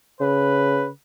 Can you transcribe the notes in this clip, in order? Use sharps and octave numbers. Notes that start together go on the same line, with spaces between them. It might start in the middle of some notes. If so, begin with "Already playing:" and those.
C#3 B4